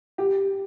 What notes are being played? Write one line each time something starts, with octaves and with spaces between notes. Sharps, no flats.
G4